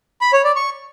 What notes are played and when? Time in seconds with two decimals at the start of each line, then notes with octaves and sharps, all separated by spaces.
0.21 B5
0.33 C#5
0.44 D5
0.56 C#6